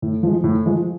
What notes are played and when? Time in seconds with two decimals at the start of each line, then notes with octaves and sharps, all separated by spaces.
0.02 A2
0.23 F3 G#3
0.44 A2
0.66 F3 G#3